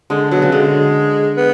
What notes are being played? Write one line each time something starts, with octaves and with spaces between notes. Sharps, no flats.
D3 G#3
B2 F#3
C#3
D3 G#3
B3